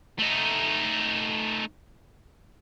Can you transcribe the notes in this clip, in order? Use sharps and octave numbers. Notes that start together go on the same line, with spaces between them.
A3 D#4